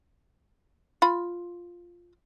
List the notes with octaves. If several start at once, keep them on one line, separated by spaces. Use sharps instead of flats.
F4 B5